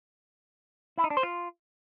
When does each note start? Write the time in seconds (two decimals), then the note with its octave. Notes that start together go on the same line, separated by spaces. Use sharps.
0.98 E4
1.04 D#4
1.10 D4
1.17 C5
1.23 F4